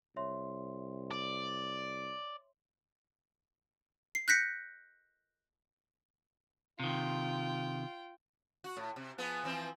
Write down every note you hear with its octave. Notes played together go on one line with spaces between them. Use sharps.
C2 C#5 E5 C6
D5
C7
F#6 G6 A#6 B6 C#7
C3 D#3 F4 G5
F#4
A2
C3
F3 B3 G#4
E3 F3 C4